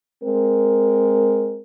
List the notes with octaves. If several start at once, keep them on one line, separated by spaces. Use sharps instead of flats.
G#3 C4 A#4